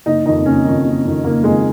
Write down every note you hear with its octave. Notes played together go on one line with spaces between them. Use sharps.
F#1 D#4
F2 D#3 D#4
F#1 C#4
F2 D#3
F#1
F2 D#3
F#1 A#3
F2 D#3 G#3